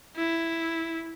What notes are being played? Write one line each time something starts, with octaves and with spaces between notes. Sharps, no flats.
E4